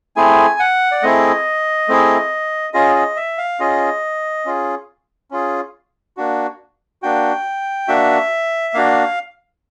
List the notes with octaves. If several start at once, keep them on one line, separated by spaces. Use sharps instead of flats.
A3 C4 E4 G#4 G#5
F#5
D5
A3 C4 E4 G#4 D#5
A3 C4 E4 G#4
C#4 F4 G#4 D#5
D#5
E5
F5
C#4 F4 G#4 D#5
C#4 F4 G#4
C#4 F4 G#4
A#3 D4 F#4
A#3 D4 F#4 G5
A#3 D4 F#4 E5
A#3 D4 F#4 F5